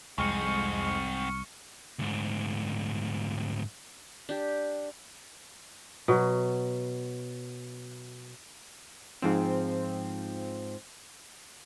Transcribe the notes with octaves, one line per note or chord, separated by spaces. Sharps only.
C2 F2 G#2 G#3 C4 C#6 F6 C#7
D2 G#2
D4 G4
B2 F#3
G#2 F3 C4